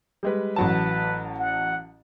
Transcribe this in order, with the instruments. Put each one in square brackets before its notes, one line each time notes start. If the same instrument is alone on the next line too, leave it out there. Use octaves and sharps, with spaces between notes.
[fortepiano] G3 G#3 B4
[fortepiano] A1 F#3 A5 [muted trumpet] B4
[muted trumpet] F#5